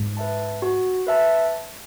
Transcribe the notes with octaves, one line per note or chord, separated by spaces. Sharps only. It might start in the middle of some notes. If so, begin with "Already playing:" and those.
Already playing: G#2
B4 E5 A5
F#4
B4 E5 A5